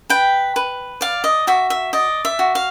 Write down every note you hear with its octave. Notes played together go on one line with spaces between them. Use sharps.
B4 G5
B4
D5 F5
D#5
F#4 E5
E5
D5 D#5
E5
F#4
F5